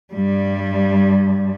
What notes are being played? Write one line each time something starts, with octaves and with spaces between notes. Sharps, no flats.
G2 G3